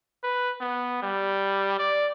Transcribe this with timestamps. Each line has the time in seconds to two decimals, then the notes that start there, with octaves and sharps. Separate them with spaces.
0.24 B4
0.61 B3
1.02 G3
1.78 D5